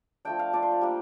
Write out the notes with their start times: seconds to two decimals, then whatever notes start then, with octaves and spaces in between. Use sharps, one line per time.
0.25 F3 A3 D4 G5
0.39 F5
0.53 A3 D4 F4 D5
0.63 C5
0.72 D5
0.81 G3 A#3 D4